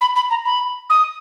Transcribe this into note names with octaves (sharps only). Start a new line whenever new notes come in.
B5
B5
A#5
B5
D#6